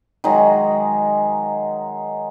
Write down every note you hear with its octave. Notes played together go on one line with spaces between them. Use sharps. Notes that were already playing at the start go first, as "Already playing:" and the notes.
D#3 F#3 G#3